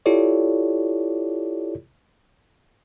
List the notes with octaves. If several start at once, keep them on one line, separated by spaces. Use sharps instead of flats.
E4 F4 G4 A4 C#5 D5